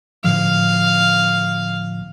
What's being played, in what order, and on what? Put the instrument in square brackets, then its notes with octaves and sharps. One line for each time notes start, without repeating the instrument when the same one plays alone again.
[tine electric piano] A2 D3 F3 [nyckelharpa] F5